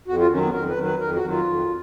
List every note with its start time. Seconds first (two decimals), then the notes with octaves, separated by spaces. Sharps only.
0.08 F2 F#4
0.19 F4
0.31 D#3 F#3 C#4
0.43 B3
0.53 F2 A#4
0.69 B4
0.76 D#3 F#3
0.84 B4
1.00 F2 A#4
1.15 F#4
1.23 D#3 F#3
1.30 F4
1.46 F2